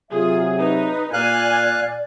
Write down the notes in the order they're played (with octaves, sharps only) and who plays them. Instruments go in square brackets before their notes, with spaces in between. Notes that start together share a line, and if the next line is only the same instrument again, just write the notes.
[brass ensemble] C3 F#3 E5 [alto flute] F4 [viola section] G#4
[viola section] D#4 [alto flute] B4
[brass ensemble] A#2 [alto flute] D5 [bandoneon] F5 F#6 [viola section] G#5